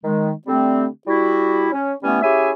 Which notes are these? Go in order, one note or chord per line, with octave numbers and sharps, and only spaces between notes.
D#3 G#3
D3 G3 A3 C4
G3 E4 F#4
C#4
E3 G3 A3 B3 C#4
C#4 E4 G4 G#4 E5 G#5